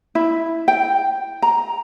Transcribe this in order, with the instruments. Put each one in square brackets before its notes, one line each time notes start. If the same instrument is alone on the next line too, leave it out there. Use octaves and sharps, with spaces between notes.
[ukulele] E4
G5
A#5